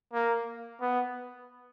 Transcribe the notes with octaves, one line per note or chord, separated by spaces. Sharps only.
A#3
B3